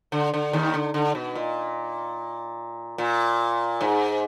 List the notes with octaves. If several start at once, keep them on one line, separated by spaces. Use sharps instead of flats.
D3
D3
D#2 D#3
D3
D3
B2
A#2
A#2
G#2